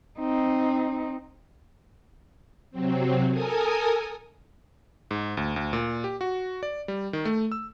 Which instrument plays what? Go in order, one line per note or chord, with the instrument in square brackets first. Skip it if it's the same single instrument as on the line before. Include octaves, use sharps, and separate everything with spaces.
[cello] C4 D#4
[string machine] C3 F#3 C4
A4 A#4 G#5 D#6
[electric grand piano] G#2
D2
D2
A#2
G4
F#4
D5
G3
D#3
A3
E6